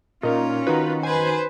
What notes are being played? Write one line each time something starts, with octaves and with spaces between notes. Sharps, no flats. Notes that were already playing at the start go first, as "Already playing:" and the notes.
A#2 C#4 D#4 F4 A#4
D#3 D#4 F#4 B4
B4 C5 G#5